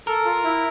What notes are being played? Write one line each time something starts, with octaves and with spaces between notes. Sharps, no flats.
A4 A#4
F4
E4